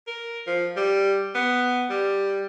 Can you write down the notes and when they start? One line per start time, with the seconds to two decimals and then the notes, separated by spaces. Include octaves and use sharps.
0.07 A#4
0.47 F3
0.77 G3
1.35 B3
1.90 G3